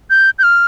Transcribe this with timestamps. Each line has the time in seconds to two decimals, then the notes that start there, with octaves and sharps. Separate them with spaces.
0.10 G6
0.39 G6
0.43 F6